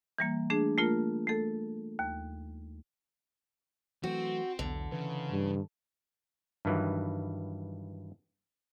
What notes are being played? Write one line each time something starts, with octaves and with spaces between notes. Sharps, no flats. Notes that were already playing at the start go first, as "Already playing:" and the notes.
E3 G3 A#3
A3 D4 G#4
A3 A#3 F4 A#4
A3 A4
D#2
E3 F#3 A3 C4 F#4
B1 E2 D3
C#3 E3
G2
G2 D#3 E3 F#3